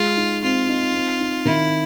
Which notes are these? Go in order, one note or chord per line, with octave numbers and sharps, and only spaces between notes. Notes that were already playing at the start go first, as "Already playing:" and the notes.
Already playing: G#3 F4
D#4
C4 F4
D#4
C4
D#4
D#3 E4